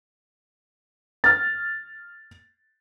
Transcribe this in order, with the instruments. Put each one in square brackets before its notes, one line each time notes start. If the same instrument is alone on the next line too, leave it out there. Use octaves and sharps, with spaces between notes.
[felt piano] F6 A6